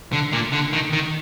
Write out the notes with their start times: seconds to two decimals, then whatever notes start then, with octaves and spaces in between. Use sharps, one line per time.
0.13 D3
0.33 A#2
0.52 D3
0.73 D#3
0.93 D#3